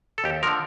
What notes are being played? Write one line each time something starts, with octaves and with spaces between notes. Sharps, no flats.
A4
D#2 G4
D3 F3 A#4